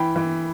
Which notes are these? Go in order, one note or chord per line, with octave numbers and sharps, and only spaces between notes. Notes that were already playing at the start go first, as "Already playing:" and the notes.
Already playing: E3 G5 B5
E3